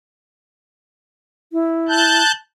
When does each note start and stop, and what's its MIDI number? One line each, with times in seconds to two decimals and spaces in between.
1.53 2.22 64
1.88 2.32 81
1.88 2.32 90
1.88 2.32 91